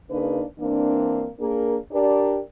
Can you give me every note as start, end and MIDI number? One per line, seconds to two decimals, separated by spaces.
0.10 0.43 49
0.10 0.43 58
0.10 0.43 62
0.10 0.43 63
0.10 0.43 71
0.59 1.28 52
0.59 1.28 58
0.59 1.28 60
0.59 1.28 62
1.39 1.76 58
1.39 1.76 62
1.39 1.76 68
1.39 1.76 70
1.92 2.40 62
1.92 2.40 67
1.92 2.40 70
1.92 2.40 74